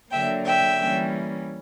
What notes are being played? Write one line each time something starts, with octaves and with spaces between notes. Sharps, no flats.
D3 F#3 A#3 E5 G5
E5 G5
E3 G3 A#3 C#4